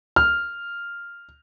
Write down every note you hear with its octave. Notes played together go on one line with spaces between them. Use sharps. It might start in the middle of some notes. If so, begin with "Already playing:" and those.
F6